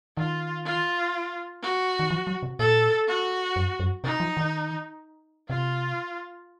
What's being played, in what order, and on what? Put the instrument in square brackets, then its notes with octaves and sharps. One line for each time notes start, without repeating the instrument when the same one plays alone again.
[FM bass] D#3 [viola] F4
[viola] F4
F#4
[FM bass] D#3
F3
F#3
C3
[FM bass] A#2 [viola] A4
[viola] F#4
[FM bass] F#2
F#2
[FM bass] C3 [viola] D#4
[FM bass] F3
D#3
[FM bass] C3 [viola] F4